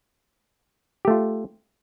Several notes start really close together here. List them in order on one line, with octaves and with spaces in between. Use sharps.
G4 A3 F4